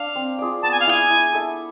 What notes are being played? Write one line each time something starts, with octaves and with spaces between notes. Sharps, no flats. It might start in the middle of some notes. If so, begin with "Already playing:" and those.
Already playing: D4 F5
C4
F4 G#4 D5
B3 A5
G#5
F5
E4 G#4 G#5
E4
A4 E5